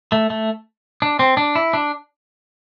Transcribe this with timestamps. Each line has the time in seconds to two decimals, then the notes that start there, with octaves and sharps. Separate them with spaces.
0.12 A3
0.30 A3
1.02 D4
1.19 C4
1.37 D4
1.55 E4
1.73 D4